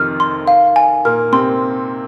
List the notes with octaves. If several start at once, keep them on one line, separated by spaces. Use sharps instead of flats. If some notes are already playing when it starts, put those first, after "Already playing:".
Already playing: F2 C3 D#3 F3 F6
C6
F5
G#5
A#2 A#3 F6
C3 C4 C6